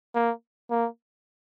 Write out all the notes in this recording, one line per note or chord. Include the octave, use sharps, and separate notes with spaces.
A#3
A#3